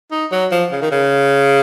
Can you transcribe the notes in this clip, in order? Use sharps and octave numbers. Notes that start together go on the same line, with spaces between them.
D#4
F#3
F3
C#3
D#3
C#3